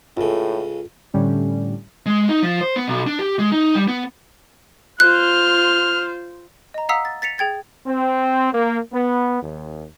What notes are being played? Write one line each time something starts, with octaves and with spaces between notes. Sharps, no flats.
C#2 A2 C#3 F4 A4
A2 D3 G3 C#4
G#3
D#4
F3
C5
B3
B1
D4
G4
G#3
D#4
G3
B3
F4 C5 F6 F#6
D#5 A#5
F5 F#5 A#5 D#6 E6 B6
A6
A6 B6 C#7 F7
G#4 G5 G#6 A6
C4
A#3
B3
D#2